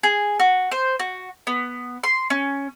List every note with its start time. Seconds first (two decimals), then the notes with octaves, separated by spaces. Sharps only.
0.03 G#4
0.40 F#4
0.72 C5
0.99 F#4
1.47 B3
2.03 C6
2.30 C#4